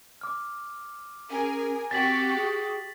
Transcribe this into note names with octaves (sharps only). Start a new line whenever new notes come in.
D6 F6
C#4 G#4 A#4 G#5
C4 F#4 G4 A6 B6 F#7
G#4